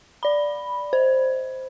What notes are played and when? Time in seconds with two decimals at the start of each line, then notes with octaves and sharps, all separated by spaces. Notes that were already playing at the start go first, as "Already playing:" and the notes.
0.23 D5 B5
0.93 C5